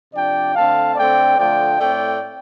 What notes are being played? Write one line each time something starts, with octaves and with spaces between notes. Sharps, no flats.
C3 F3 D4 D5 G5
D3 A3 C4 F5 A5
D3 A3 C4 D5 G5
D3 F3 A3 D5 G5
A2 A3 C4 D5 G5